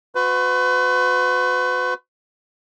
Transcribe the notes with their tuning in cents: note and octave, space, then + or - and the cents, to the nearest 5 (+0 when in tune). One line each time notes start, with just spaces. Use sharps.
F#4 -30 B4 +35